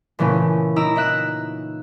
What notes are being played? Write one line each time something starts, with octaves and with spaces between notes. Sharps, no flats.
A#2 C#3 E3 A3 C#4
D#4 E4 A#5 E6 D7
D#4 E5 F#6 E7